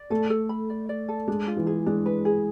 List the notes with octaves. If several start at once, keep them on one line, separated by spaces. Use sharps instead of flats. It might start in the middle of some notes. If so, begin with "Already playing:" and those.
Already playing: D5
A3 A4
A4
B5
D5
D5
A4
G#3 D4
F4
E3
G#4
G#3 D4
B4
G#4